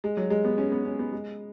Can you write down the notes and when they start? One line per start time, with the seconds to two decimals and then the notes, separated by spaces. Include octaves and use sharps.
0.04 G#3
0.17 F#3
0.30 G#3
0.45 B3
0.58 C#4
0.72 B3
0.85 C#4
0.99 B3
1.12 G#3